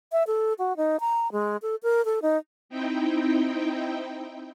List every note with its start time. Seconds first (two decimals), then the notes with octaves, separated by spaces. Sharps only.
0.12 E5
0.27 A4
0.59 F#4
0.77 D#4
1.00 A#5
1.32 G#3
1.62 A4
1.83 A#4
2.05 A4
2.22 D#4
2.69 C4 D#4 E4 G5